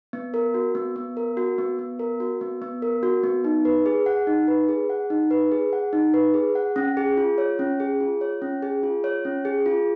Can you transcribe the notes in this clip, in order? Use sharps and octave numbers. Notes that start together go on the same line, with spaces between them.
B3
A#4
F#4
B3
B3
A#4
F#4
B3
B3
A#4
F#4
B3
B3
A#4
F#4
B3
D#4
B4
G#4
F#5
D#4
B4
G#4
F#5
D#4
B4
G#4
F#5
D#4
B4
G#4
F#5
C#4
G#4
F4
C#5
C#4
G#4
F4
C#5
C#4
G#4
F4
C#5
C#4
G#4
F4